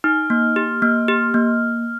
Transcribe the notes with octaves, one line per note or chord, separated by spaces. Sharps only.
D#4 F6
A#3
G4
A#3 F6
G4
A#3